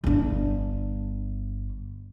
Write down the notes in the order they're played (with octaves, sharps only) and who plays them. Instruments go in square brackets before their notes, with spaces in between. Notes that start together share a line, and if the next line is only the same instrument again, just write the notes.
[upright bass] G1 D4